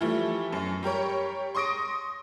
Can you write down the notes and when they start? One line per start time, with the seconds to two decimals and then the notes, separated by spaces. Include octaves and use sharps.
0.01 E3 F3 G3 A3
0.52 F#2
0.83 G3 G4 A#4 C#5
1.55 C6 C#6 D#6 A#6 D7